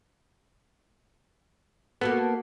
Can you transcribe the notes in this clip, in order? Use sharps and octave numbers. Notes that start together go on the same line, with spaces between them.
A#3 B3 F#4 A4